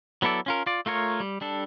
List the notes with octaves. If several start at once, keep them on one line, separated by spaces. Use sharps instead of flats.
F#3 B3 E4 A4 D5
C#4 F4 A#4
F4 D5
A3 F4 A#4 C#5
G3
G3 D4 A4